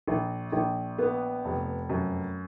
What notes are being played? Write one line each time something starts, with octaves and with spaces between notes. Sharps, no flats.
A#1
A#1
B3
F1
F#2